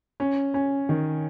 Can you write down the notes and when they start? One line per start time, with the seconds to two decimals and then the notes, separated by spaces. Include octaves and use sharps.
0.20 C#4
0.54 C#4
0.89 D#3